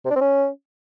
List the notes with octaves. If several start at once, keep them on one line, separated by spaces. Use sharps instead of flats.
C3
D4
C4
C#4